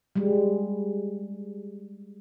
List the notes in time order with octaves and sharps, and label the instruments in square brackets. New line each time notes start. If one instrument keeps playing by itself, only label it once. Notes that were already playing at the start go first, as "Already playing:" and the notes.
[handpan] G3 G#3